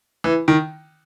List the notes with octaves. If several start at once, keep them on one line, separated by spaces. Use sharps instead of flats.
E3
D#3